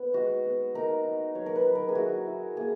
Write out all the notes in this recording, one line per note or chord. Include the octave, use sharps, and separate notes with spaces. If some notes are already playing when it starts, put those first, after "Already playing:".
Already playing: B3 D#4
G#3 F#4
B3
D#4 A#4
D#4
F#3 C#5
A#4
B4
F#3
A#4
G#4
E4 F#4
E4
A#3 G#4